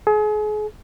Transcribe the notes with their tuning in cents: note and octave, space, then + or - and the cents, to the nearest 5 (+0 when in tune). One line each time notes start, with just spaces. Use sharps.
G#4 +35